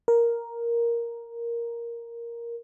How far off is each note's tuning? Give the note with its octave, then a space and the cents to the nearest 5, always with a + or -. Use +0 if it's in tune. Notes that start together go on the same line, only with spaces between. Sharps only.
A#4 +5